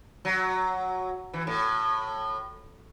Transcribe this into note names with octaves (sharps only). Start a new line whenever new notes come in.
F#3
E3
A2